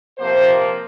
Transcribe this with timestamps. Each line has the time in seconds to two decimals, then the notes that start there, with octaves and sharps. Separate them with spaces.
0.18 C3 F3 A#3 C5